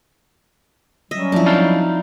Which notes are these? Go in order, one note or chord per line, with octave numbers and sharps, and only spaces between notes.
F#3 G3 C#4 D#5 E5
F3 C4 D4 E4
D#4 F5 A5